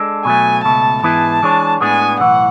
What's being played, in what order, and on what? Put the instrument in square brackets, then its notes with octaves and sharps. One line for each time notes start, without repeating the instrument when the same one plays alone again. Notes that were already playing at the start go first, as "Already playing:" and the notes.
Already playing: [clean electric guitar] G#3 D4 A4
[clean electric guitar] B2 F#3 A3 [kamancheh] G#5
[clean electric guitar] C#2 B2 A3 [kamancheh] A5
[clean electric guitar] G#2 E3 B3 E4 G#4 [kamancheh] A5
[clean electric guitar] E3 G#3 D4 G#4 C#5
[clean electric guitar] A2 G#3 B3 D4 G#4 [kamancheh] G#5
[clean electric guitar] B1 A2 E3 [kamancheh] F#5